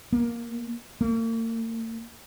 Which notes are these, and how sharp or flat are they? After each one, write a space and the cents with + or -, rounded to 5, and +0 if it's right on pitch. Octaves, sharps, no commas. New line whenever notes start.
A#3 +5
A#3 -45